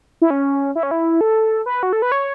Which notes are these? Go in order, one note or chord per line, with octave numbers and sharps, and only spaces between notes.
E4
C#4
E4
C#4
E4
A4
B4
F#4
A4
B4
C#5